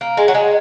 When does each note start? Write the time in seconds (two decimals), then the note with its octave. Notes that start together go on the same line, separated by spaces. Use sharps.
0.01 A#3
0.17 G#3
0.28 F#3
0.35 G#3